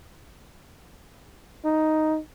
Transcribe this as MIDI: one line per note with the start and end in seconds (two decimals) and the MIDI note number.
1.65 2.18 63